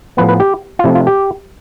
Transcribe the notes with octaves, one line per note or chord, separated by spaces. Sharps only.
A2 F3 B3 B4
B4
G4
F4
C3 F3 A3 C4 E4
F4
G4